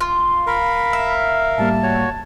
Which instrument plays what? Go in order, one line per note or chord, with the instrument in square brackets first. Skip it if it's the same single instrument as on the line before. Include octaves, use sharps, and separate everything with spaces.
[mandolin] F4
[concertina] A#4 F5 [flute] B5
[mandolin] E5
[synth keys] A2 G3 A#3 [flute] A5
[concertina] F#4 C#5